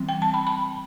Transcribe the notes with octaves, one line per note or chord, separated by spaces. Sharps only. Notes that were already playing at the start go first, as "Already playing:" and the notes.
Already playing: E3 G3 C4
G5
A5
B5
B5